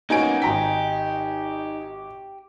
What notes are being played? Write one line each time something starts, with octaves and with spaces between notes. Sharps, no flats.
A#3 B3 C#4 D#4 F#4 G#5 D7
G#1 G4 A#5 B6